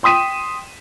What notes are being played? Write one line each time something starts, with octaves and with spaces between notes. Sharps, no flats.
G5 C6 D#6 B6 D#7 E7